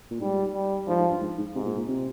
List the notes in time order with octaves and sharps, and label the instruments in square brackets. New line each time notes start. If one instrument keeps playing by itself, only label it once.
[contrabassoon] A#2
[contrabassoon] G#2 [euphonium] G3
[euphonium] G3
[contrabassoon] G#2 [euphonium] F3
[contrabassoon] G#2
G2
G#2
G#2
[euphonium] G#2 [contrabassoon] C3
[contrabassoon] A#2
A#2
C3